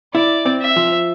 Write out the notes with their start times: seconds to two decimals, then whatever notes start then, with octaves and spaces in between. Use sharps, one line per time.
0.14 E4 D5
0.45 C4
0.61 E5
0.76 F3